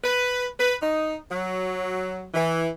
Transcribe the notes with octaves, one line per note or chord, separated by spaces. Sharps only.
B4
B4
D#4
F#3
E3